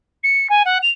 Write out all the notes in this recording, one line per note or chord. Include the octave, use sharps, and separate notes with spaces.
C#7
G#5
F#5
F7